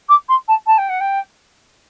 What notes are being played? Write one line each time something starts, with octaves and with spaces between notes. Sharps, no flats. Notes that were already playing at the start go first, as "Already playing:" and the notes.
D6
C6
A5
A5
G5
F#5
G5